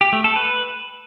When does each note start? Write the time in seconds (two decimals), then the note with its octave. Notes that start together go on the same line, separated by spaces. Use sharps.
0.01 G4
0.13 A3
0.24 A4
0.36 B4